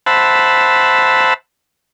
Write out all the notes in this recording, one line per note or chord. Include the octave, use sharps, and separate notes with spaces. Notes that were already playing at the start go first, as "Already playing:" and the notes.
C5 E5 F#5 A5 B5